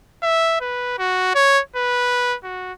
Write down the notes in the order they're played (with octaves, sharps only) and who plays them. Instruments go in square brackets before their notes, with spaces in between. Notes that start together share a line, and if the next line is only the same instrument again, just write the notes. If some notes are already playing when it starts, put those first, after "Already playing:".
[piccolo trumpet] E5
B4
F#4
C#5
B4
F#4